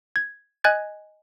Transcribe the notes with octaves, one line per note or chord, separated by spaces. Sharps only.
G#6
D#5 G#5 F#6 G#6 A6